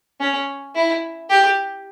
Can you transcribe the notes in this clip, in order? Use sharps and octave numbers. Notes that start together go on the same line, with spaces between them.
C#4
E4
G4